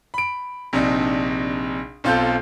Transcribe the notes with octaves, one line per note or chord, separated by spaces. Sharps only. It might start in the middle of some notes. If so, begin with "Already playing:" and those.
B5 D7
A#1 C3 D4 D#4
B1 C4 F4 A4 G6